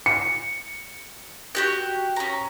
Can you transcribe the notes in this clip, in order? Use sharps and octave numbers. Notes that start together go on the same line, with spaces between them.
C#7
F#4 G4 F#6
C#4 A#5